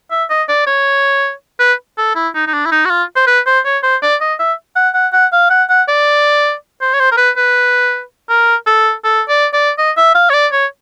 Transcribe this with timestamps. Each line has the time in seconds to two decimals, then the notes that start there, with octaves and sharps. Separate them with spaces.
0.11 E5
0.30 D#5
0.49 D5
0.67 C#5
1.60 B4
1.98 A4
2.15 E4
2.35 D#4
2.47 D#4
2.54 D4
2.66 E4
2.71 D#4
2.85 F#4
2.90 F4
3.16 C5
3.27 B4
3.46 C5
3.65 C#5
3.83 C5
4.02 D5
4.21 D#5
4.40 E5
4.76 F#5
4.94 F#5
5.13 F#5
5.32 F5
5.50 F#5
5.69 F#5
5.88 D5
6.81 C5
6.94 C#5
7.00 C5
7.12 A#4
7.17 B4
7.37 B4
8.29 A#4
8.67 A4
9.04 A4
9.29 D5
9.53 D5
9.78 D#5
9.97 E5
10.15 F5
10.30 C#5
10.34 D5
10.53 C#5